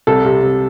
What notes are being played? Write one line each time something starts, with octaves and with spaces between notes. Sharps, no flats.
C2 A4
C3
C3